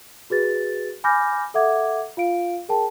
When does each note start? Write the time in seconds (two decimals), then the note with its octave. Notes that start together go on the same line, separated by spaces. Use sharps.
0.30 F#4 G#4 B4 A6
1.04 G#5 B5 D6 F6 G6 A#6
1.54 A4 E5 F#5 D6 G#6
2.17 F4 F5 D7
2.69 G#4 A#4 G5 A5